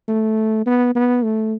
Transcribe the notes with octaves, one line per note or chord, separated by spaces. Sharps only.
A3
B3
B3
A3